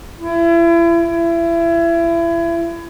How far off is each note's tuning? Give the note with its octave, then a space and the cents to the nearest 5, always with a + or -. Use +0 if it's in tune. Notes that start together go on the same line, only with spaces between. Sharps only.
E4 +35
E4 +30